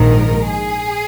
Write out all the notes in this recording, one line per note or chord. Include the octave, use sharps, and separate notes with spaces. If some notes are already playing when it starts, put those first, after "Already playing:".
Already playing: A#1 G#2 D#3 A#4
G#4